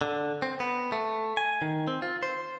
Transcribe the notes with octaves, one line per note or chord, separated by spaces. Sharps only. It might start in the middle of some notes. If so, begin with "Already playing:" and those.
D3
C4
B3
A3
G#5
D#3
C4
F4
C5